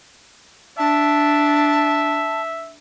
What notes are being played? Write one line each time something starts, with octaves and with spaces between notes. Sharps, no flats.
D4 E5 A5